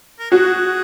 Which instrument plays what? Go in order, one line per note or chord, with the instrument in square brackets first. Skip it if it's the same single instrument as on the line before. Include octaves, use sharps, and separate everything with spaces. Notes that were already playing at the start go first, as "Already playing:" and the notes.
[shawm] A#4
[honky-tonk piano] F#4 [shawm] G#4